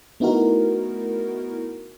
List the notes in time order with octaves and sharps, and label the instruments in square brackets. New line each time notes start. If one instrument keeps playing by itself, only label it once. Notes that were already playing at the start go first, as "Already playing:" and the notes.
[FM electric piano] A3 B3 D#4 E4 F#4 A#4